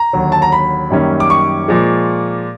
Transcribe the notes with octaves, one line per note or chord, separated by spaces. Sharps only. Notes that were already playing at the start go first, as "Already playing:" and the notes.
Already playing: A#5
D#2 D3 F#3
A5
A#5
B5
F#2 D#3 G3 A#3 C#4
D6
C#6
A#2 F3 G#3